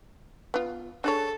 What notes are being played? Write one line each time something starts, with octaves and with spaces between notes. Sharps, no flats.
B3 F4
D4 G#4 A4 C#5